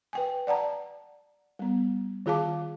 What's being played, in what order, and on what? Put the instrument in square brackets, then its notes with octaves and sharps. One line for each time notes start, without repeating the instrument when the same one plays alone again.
[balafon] B4 G5 G#5
D5 F#5 A5 A#5
G3 B3
D#3 F4 G#4 F5 A5 D6